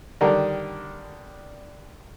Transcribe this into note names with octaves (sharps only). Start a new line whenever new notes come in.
D3 D#3 G3 D4 A#4